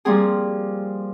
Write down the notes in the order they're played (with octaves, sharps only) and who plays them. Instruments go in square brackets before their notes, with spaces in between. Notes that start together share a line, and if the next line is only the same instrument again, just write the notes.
[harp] F3 G3 A#3 C4 G#4